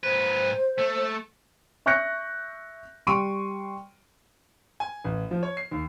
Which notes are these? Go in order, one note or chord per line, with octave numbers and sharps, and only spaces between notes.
G#2 B4 C5
A3
E5 C#6 F#6 G6 A#6 C#7
G3 C6 C#6 D7 D#7
G#5
A1
F3
C#5
C7
D#2